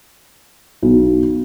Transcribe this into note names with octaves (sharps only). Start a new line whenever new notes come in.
B1